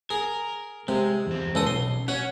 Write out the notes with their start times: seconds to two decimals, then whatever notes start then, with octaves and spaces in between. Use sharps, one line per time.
0.10 G#4 A#4
0.88 C3 G#3
1.27 E2 C4
1.55 C#2 A4 D#6
1.67 B1 C6
2.08 C#4 F#4 C#5